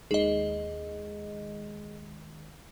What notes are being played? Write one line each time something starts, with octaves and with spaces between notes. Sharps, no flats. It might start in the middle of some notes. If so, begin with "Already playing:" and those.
D#2 D#3 G#3 G#4 D#5